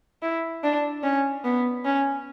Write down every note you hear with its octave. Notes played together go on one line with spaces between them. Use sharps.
E4
D4
C#4
B3
C#4